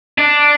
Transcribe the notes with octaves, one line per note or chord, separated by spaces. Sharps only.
D4